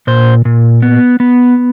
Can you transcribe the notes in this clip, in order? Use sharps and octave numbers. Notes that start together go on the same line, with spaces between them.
A#2 C5
A#2
B3
B3